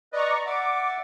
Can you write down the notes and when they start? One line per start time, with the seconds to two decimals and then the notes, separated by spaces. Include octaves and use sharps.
0.13 B4 D5 D#5 A#5 C#6
0.46 D5 E5 F#5 D6